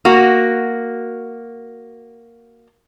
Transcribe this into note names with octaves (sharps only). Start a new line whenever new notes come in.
A#3 F#4